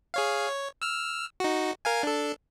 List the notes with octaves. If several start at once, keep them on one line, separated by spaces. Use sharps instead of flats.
G#4 C#5 F5
C#5
E6 F6
D#4 F#4
A#4 F5 G#5
D4 A4